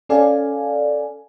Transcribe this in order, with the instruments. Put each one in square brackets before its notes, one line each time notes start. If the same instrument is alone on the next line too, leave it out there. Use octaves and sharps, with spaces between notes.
[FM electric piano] C#4 A4 D5 F5 G#5